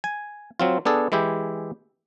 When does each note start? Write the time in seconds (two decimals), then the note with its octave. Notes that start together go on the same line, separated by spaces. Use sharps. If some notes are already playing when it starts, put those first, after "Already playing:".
0.04 G#5
0.60 F#3 C4 F4
0.85 B3 D4 G#4 A4
1.12 E3 G#3 E4 G4